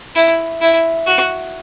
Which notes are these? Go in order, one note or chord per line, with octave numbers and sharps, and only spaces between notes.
E4
E4
F#4